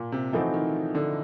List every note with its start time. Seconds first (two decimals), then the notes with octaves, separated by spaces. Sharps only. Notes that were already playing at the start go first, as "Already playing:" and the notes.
Already playing: A#2
0.12 C3
0.33 E3 F3 A3 C4 D#4 F#4
0.54 D#3
0.95 D3